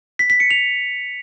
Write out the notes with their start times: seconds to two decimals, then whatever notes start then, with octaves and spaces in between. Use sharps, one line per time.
0.19 B6
0.30 B6
0.40 C#7
0.51 F7